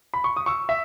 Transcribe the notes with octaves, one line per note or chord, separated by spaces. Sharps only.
B5
C#6
D#6
C#6 E6
E5